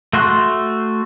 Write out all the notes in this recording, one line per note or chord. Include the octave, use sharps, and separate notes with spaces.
A3 F#4 C6 F#6